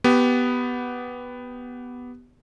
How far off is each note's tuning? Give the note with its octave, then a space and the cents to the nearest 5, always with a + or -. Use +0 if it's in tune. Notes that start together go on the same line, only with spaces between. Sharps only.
B3 +0 G4 -10